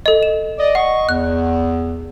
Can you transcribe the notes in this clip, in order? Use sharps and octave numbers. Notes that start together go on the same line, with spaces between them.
A4 D#5
E7
D5 D#5
D#5 F#5 C#6
E2 F#6